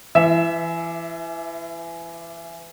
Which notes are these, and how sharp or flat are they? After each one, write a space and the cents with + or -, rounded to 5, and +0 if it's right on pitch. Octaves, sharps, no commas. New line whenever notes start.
E3 +25 E5 -5